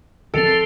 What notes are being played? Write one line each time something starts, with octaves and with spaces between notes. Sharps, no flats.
D3 F3 C4 A4